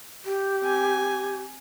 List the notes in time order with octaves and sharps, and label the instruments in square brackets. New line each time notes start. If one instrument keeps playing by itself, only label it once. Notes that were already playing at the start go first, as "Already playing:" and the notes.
[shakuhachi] G4
[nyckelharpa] C4 G#5